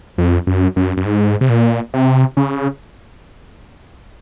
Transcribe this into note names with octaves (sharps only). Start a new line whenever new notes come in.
F2
F#2
F#2
F#2
G#2
C3
A#2
C3
C#3